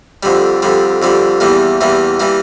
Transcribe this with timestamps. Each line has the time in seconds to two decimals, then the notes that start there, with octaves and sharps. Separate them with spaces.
0.23 F2 D3 G3
0.62 F2 D3 G3
1.02 F2 D3 G3
1.40 E2 E3 G3 A#3
1.81 E2 E3 G3 A#3
2.20 E3 G3 A#3